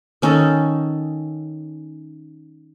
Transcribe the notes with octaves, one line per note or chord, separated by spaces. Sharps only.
D#3 C#4 D#4 A4